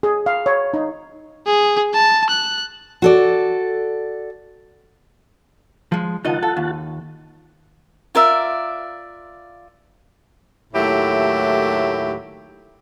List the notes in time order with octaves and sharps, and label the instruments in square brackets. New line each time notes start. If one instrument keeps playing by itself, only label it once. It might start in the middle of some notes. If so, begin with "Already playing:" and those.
[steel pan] G#4
F5
C#5
D#4
[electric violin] G#4
A5
F#6
[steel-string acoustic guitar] F#4 A4 D5
[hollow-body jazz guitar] F3 G#3
[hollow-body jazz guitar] C#2 D#3 D#5 [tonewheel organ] F4 F#5 A5
[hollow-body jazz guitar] A4
D#2
[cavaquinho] F4 A#4 D5 E5
[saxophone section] D#2 A2 F#3 A3 E4 G4